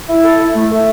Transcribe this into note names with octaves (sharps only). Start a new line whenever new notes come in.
E4
A4
E4
A3
A3